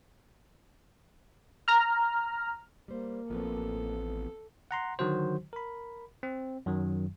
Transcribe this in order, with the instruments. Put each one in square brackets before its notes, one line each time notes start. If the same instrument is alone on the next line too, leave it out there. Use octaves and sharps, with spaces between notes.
[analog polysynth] A#5 F6
[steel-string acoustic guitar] G3 C5 [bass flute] A#3
[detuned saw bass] A1 [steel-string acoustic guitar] F3 B3 C4 [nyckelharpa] A4
[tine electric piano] F#5 A#5 C6
D3 D#3 F#3 F#4 C5
A#4 B5
C4
F#2 D#3 F#3